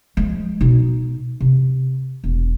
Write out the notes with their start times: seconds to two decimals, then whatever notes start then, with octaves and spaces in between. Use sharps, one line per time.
0.17 F3 G#3
0.61 B2 D#4
1.40 C3
2.24 E1